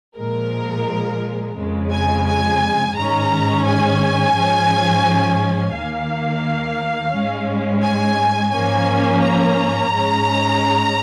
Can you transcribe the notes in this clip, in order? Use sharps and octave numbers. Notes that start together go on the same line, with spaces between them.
A#2 F3 G#3 A#4
F2 C#3 G#3
G#5
G#5
G#2 D#3 G#3 C#4 A#5
G#5
G#2 F3 G#3 C#4
D#2 D#3 A#3 F5
G#2 G#3 C#4
G#5
G#2 F3 A#3 C#4 G#5
A#5
G#2 G#3 C#4